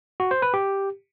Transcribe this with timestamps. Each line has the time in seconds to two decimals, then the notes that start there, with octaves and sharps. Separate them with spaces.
0.20 F#4
0.31 C5
0.42 B4
0.54 G4